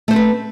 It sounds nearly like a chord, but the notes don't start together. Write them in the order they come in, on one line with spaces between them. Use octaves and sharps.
A3 C5 C4 B4